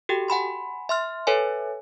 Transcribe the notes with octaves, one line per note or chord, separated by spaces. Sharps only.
F#4 G4 A4 G5
F#5 G#5 B5 C6
E5 C6 F6
A4 B4 C#5 E5 G#5